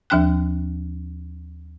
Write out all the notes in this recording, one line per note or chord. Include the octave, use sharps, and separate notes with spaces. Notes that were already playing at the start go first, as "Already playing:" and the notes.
D#2 F3 D4 G5 F#6